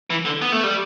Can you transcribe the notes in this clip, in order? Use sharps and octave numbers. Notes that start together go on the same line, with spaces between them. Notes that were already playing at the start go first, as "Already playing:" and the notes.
E3
D3
B3
A3
G3